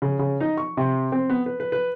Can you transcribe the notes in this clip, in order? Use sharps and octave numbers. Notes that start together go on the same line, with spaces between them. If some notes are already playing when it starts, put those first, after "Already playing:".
C#3
C#3
D#4
C#6
C3
C4
B3
B4
B4
B4